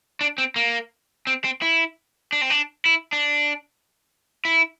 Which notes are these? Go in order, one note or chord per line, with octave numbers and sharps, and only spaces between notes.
D4
C4
A#3
C4
C4
E4
D4
C4
D4
E4
D4
E4